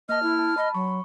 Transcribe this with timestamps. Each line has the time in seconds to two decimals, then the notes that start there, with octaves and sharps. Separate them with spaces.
0.09 A#3 D#5 A5 F6
0.23 E4
0.39 A5
0.57 D#5 B5
0.75 F#3 C#6